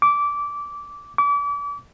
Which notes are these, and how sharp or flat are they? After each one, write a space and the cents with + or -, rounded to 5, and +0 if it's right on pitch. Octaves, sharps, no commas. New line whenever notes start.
D6 -15
D6 -35